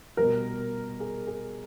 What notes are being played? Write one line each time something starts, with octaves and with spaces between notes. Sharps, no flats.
B2 G3 A#4
G#4
G#4